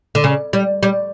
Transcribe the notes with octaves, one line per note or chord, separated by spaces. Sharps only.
D3
C#3
G3
G3